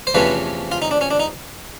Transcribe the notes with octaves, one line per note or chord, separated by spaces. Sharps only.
C5
E2 C3 F3 A3 C#4 B4
F4
D#4
D4
C#4
D4
D#4